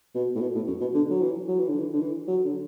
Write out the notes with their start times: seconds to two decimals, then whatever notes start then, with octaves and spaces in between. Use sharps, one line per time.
0.15 B2
0.35 A2
0.41 B2
0.55 A2
0.67 F#2
0.81 B2
0.94 D3
1.11 F#3
1.22 E3
1.48 F#3
1.59 E3
1.69 D3
1.79 E3
1.93 D3
2.01 E3
2.28 F#3
2.45 D3